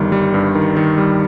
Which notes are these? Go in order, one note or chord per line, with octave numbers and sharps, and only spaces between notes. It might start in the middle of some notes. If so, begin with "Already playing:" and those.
Already playing: G1 D#3 G3
G3
G2
D#3
D#3
G3